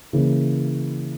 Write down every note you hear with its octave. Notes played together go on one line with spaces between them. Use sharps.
C#3 E3 A#3 E4